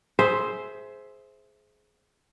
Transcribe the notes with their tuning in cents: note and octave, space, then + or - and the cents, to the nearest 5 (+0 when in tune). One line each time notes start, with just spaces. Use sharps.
G#4 +20 C5 +0 E5 +0